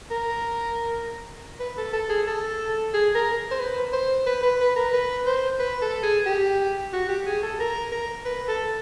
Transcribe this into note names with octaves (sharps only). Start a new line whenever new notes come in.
A#4
B4
A4
A4
G#4
A4
G#4
A#4
C5
B4
C5
B4
B4
B4
A#4
B4
C5
B4
A4
G#4
G4
F#4
G4
G#4
A4
A#4
A#4
B4
A4